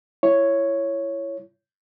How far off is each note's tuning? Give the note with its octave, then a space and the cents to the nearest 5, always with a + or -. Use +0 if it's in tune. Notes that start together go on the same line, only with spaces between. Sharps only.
E4 +25 C#5 +0